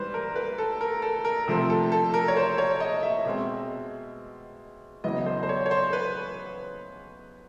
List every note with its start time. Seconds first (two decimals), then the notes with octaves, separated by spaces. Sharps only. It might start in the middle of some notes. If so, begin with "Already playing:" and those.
Already playing: G#2 E3 G3 B4 C5
0.14 A#4
0.36 B4
0.58 A4
0.81 A#4
1.02 A4
1.25 A#4
1.48 C3 F3 A3 C4
1.70 A4
1.92 A4
2.14 A#4
2.28 C#5
2.37 C5
2.58 C#5
2.80 D#5
3.03 E5
3.25 B2 G#3 C4
5.04 E2 C#3 F#3 B3 E4 D#5
5.26 C5
5.43 C5
5.49 C#5
5.66 C#5
5.71 C5
5.93 B4